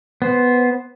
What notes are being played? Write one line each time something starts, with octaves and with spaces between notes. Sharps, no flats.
B3 C5